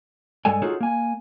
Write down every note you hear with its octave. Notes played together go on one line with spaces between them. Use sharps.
G2 G#3 A4 D5 G#5
D#4 F4 F#4 G#4 A4 C#5
A#3 G#5